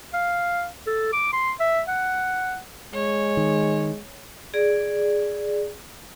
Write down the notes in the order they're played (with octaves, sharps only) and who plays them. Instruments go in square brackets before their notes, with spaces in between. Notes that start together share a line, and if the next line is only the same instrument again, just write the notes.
[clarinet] F5
A4
D6
C6
E5
F#5
[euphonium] G#3 [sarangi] C#5
[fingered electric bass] D#3
[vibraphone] G#4 D5